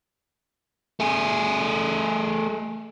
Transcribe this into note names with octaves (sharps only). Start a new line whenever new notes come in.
A3 G#4